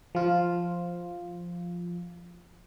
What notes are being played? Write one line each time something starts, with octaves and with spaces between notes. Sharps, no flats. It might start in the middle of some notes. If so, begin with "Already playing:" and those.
F3 F4